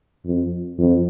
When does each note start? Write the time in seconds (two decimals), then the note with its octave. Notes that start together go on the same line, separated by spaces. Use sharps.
0.26 F2
0.78 F2